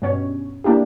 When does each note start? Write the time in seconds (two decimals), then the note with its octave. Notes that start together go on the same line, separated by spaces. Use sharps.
0.02 G2 B2 C#4 C#5
0.64 A#3 D4 E4 G4